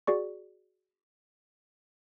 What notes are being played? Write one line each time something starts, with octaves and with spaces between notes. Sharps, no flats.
F#4 G#4 D5 C#6